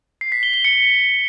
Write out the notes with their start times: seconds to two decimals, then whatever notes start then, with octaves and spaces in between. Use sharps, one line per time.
0.21 C7
0.32 B6
0.43 G7
0.54 G7
0.65 C#7